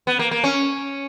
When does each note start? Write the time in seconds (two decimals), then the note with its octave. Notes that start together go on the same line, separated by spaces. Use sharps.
0.07 B3
0.19 A#3
0.31 A#3
0.44 C#4